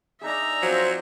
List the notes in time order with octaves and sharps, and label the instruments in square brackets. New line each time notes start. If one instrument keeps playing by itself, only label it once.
[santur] D4 D#4 G#4 [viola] E5 A#5
[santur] F3 C4 [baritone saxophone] F#3 [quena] C5